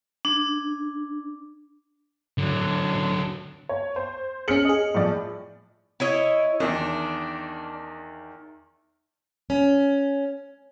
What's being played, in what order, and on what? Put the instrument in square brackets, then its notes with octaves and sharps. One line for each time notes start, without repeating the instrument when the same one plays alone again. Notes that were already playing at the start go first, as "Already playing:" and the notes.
[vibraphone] D4
[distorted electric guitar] D3 F#3
[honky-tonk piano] C#5
C5
[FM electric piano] C#4 G#4 [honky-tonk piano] F6 C#7 F#7
[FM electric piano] G#4 D#5
[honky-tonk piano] A2 F3 D5
[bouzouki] E4 C#5 D#5
[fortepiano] E2 D#3 [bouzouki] D4
[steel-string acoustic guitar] C#4